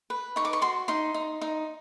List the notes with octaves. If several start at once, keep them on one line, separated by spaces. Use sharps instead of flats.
B4
D#4 C#6
D6
C#6
F#4 C6
D#4 C6
D#4
D#4